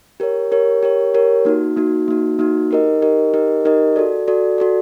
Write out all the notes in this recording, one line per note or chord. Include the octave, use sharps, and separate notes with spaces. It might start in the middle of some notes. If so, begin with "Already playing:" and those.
G4 A#4 C#5
G4 A#4 C#5
G4 A#4 C#5
G4 A#4 C#5
A#3 D#4 F#4
A#3 D#4 F#4
A#3 D#4 F#4
A#3 D#4 F#4
D#4 G4 A#4 D#5
D#4 G4 A#4 D#5
D#4 G4 A#4 D#5
D#4 G4 A#4 D#5
F#4 A4 D5
F#4 A4 D5
F#4 A4 D5